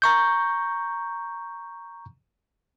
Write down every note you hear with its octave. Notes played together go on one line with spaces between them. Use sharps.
A#5 C#6 G6